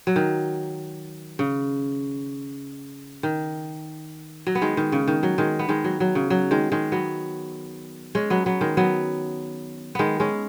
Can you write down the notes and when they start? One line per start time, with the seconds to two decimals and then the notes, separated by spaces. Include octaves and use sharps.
0.07 F#3
0.16 D#3
1.39 C#3
3.23 D#3
4.47 F#3
4.55 B3
4.61 D#3 G#3
4.77 D#3
4.92 C#3
5.08 D#3
5.23 F#3
5.38 D#3 G#3
5.59 B3
5.69 D#3 G#3
5.84 F#3
6.00 F#3
6.15 C#3
6.30 F#3
6.51 D#3 G#3
6.72 D#3 G#3
6.92 F#3 B3
8.15 G#3 C#4
8.30 F#3 B3
8.46 F#3 B3
8.61 D#3 G#3
8.77 F#3 B3
9.95 D#3 G#3 B3
10.20 G#3 C#4